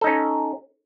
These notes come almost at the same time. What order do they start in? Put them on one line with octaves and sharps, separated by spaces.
A4 D#4 C#4